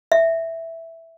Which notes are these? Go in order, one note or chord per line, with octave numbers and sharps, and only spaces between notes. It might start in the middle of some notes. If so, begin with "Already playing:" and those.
E5